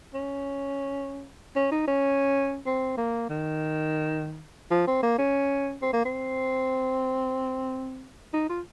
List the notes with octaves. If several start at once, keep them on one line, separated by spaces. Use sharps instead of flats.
C#4
C#4
D#4
C#4
C4
A#3
D#3
F3
C4
A#3
C#4
C4
A#3
C4
D#4
F4